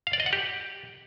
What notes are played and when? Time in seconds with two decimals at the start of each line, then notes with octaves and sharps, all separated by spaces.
0.07 F5
0.13 D5
0.20 D#5
0.26 F#5
0.33 G4